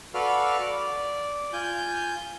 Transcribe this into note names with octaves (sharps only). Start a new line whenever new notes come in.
F#4 A4 B4 D5 F5 F6
D5
F4 G#5 G6